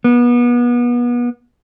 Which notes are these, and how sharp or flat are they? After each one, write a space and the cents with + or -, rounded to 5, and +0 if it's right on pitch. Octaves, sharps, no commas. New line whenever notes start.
B3 -30